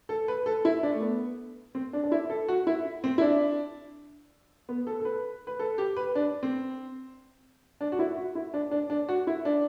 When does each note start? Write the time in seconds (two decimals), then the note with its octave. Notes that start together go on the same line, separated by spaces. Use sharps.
0.09 A4
0.28 B4
0.46 A4
0.65 E4
0.83 D4
0.92 A3
1.02 B3
1.75 C4
1.93 D4
2.04 D4
2.12 E4
2.30 A4
2.48 F#4
2.67 E4
3.04 C4
3.18 E4
3.21 D4
4.69 B3
4.87 A4
5.00 A4
5.05 B4
5.47 B4
5.59 A4
5.78 G4
5.96 B4
6.15 D4
6.43 C4
7.81 D4
7.92 F#4
7.99 E4
8.17 F#4
8.35 E4
8.54 D4
8.71 D4
8.90 D4
9.09 F#4
9.27 E4
9.45 D4